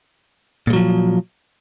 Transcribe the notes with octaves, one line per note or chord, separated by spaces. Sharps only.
A#2 F3 F#3 G#3